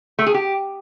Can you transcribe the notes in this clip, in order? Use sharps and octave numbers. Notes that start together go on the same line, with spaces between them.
A3
G#4
G4